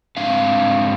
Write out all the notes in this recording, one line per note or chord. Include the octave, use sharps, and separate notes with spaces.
G#2 C4 D4 F5